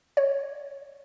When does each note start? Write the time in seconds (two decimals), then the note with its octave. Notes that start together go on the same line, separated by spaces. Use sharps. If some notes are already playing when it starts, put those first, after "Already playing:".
0.17 C#5